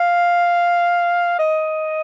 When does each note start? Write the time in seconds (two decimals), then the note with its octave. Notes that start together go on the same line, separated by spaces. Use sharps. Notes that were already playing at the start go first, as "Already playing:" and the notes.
Already playing: F5
1.39 D#5